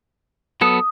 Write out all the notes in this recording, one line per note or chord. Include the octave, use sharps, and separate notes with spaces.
F#3 B3 A4 D#6